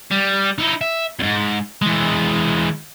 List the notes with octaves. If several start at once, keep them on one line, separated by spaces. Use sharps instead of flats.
G3
D#4 E4
E5
E2 G#2
E3 G#3